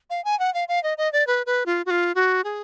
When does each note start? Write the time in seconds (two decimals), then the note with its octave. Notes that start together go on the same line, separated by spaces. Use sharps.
0.10 F5
0.25 G#5
0.39 F#5
0.54 F5
0.68 F5
0.83 D#5
0.98 D#5
1.13 D5
1.27 B4
1.46 B4
1.66 F4
1.86 F#4
1.90 F4
2.15 F#4
2.44 G#4